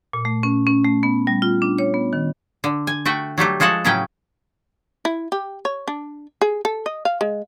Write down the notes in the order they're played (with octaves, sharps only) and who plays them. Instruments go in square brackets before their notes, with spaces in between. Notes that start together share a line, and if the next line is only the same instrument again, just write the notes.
[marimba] A#2
A3
C#4
C#4
A3
B3
G3
F4
D4
C#5
B3
D#3
[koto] D3
G#5
A3 F#4 G5
F#3 G3 A3 G4
F3 G#3 F#4 A4 F#5
A2 C#3 F#3 C#4 B4 G5
[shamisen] E4
G4
C#5
D4
G#4
A4
D#5
F5
G#3